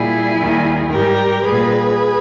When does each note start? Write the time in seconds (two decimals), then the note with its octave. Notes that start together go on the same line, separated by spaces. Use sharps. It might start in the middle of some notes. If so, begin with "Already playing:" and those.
Already playing: A#2 G3 E4 G#4
0.37 D#2 D#3 G3
0.91 G#2 G3 G4 A#4
1.44 A#2 G3 G#4 B4